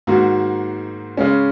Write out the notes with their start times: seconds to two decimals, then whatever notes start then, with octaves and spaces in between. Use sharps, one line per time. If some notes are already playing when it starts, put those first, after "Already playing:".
0.07 G#2 D#3 A#3 F#4
1.17 C#3 G#3 C#4